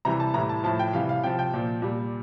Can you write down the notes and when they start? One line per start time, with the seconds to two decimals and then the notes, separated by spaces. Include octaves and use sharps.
0.05 C3 E3 G3 A#5
0.20 A5
0.34 A2 E3 G3 A#5
0.49 A5
0.64 A2 F3 A5
0.79 G5
0.93 C3 E3 G3 F5
1.09 F5
1.24 C3 F3 G5
1.39 G5
1.54 A#2 F3
1.82 A#2 G3